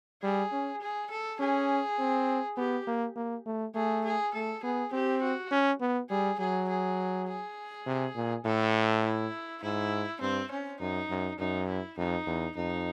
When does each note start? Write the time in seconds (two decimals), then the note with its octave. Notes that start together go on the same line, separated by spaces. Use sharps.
0.22 G3 G#4
0.52 C#4
0.81 G#4
1.11 A4
1.40 C#4 G#4
1.99 C4
2.57 B3 G4
2.87 A#3
3.16 A#3
3.46 A3
3.75 A3 G#4
4.05 G#4
4.34 A3 A4
4.63 B3 G#4
4.92 C4 G4
5.22 F#4
5.51 C#4
5.81 B3
6.10 G3 G#4
6.40 F#3 G#4
6.69 G#4
7.28 G#4
7.86 C3
8.16 A#2
8.45 A2 A4
9.04 E4
9.63 G#2 E4
10.21 G2 C4
10.51 C#4
10.80 F#2 D#4
11.10 F#2
11.39 F#2 D#4
11.68 E4
11.98 F2 D#4
12.27 E2
12.56 F2 D#4